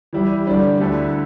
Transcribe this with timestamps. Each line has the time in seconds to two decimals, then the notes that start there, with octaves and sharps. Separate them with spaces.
0.13 E3 G3 E4 G4
0.46 D3 G3 D4 G4
0.80 D2 D3 A3 E4 A4